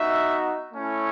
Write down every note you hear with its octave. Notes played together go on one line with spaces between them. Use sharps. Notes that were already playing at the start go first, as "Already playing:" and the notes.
Already playing: B3 D#4 F#4 E5
A3 C#4 E4